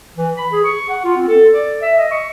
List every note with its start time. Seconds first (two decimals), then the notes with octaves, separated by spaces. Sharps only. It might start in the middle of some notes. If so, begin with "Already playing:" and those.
0.16 E3
0.37 B5
0.52 G#4
0.64 C#6
0.89 F#5
1.04 F4
1.16 C4
1.28 A4
1.53 D5
1.82 E5
1.97 D#5
2.11 C#6